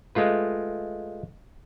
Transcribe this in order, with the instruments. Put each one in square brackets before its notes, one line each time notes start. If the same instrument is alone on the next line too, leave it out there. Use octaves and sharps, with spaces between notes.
[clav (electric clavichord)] G#3 A3 F4 B4